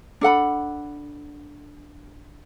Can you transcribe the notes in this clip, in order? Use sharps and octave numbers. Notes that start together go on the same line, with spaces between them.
D4 A4 F#5 B5